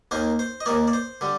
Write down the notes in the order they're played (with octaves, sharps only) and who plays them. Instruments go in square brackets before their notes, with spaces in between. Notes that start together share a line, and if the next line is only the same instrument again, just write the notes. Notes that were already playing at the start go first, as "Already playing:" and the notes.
[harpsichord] D#2 D#3 A#3 C5
C5
D#5
D#2 D#3 A#3 D5
D5
C5
D3 G3